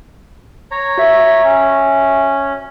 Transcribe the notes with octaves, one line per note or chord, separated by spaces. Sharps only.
C#5 A#5
F#4 E5
C#4